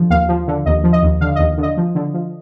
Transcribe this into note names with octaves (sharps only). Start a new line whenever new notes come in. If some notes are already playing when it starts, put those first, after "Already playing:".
Already playing: D3 F3
D#2 F5
F3
D3
D#2 D#5
F3
D#5
D#2
D3 F5
D#2 D#5
D3
D#5
F3
D3
F3